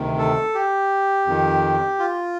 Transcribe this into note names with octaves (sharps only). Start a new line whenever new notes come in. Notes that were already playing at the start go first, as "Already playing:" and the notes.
Already playing: D2 C3 D#3
A4
G4
F2 D#3
F4